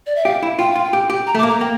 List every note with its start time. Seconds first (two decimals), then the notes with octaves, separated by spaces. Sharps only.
0.06 D5
0.16 E5
0.25 G4 F5
0.42 E4
0.59 F4 G5
0.72 F4 F5
0.85 G5
0.93 G4
1.10 G4
1.27 A#5
1.35 A3
1.39 D6
1.43 A#3
1.49 A#5
1.60 A#3 G5